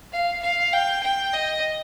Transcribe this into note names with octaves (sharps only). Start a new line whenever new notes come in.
F5
F5
G5
G5
D#5